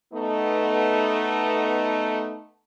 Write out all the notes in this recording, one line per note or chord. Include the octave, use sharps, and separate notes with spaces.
A3 B3 D#4